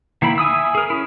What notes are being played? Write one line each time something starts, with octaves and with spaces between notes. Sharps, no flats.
D#3 A#3 E4 B5
E5 G#5 D#6 E6
G#4 A#4
C#4 E4